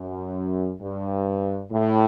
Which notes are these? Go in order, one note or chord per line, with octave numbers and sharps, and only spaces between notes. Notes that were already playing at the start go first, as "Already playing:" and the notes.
Already playing: F#2
G2
A2